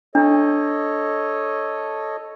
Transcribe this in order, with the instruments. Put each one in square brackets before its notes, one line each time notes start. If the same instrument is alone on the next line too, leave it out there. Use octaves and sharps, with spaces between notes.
[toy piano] D4 [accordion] A4 C#5 D#5